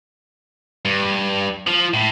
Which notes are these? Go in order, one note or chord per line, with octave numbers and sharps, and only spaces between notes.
G2
F3
A2